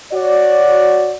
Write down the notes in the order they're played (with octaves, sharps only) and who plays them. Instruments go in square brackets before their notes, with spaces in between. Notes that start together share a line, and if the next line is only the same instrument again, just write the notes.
[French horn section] F#4 C#5 D5